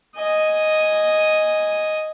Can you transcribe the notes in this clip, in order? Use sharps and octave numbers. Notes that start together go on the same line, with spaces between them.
D#5 G#5